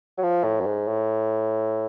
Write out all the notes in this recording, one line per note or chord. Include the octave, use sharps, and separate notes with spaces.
F#3
F3
A2
F#2
G#2
A2